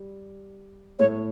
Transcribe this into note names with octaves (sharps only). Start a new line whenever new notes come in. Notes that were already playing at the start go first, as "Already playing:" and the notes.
Already playing: G3
A2 A3 C#5